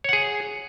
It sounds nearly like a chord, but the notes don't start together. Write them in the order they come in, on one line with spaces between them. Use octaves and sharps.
C#5 F#5 G#4